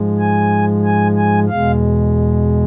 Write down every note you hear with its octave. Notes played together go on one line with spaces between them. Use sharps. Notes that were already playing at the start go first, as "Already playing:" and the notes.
Already playing: G#2 F3 G#3
G#5
G#5
G#5
E2 B2 G#3 F5